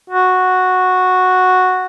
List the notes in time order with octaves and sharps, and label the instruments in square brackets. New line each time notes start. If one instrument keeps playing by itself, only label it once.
[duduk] F#4